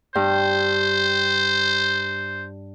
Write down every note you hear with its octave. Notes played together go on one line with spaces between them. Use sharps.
G2 C5